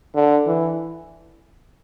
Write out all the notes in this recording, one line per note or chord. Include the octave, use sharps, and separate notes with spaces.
D3
E3